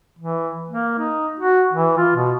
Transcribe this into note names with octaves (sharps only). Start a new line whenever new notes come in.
E3
A#3
D#4
F#4
E3
F4
B2